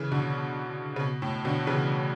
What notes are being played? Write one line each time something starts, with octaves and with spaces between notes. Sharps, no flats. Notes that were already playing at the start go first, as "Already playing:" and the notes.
Already playing: C#3 E3
B2 D3
C#3
B2
A2
B2 D3
C#3 E3